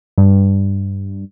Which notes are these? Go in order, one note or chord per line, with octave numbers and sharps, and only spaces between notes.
G2